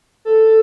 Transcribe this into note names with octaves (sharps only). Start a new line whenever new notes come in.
A4